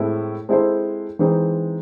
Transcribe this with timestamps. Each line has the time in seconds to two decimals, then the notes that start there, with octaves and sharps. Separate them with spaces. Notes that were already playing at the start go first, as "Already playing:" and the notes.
Already playing: A2 G#3 C4 E4 A4
0.49 G#3 C4 E4 A4 C5
1.19 E3 G#3 C4 D#4